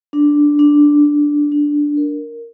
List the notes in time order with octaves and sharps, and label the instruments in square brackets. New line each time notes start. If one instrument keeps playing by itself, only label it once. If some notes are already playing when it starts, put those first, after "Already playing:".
[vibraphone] D4
D4
D4
D4
A#4